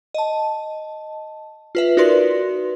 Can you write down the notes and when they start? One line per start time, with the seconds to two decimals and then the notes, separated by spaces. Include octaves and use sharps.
0.14 D#5 A5
1.75 F4 B4 E5
1.97 D#4 F#4 A#4 B4 D5 C6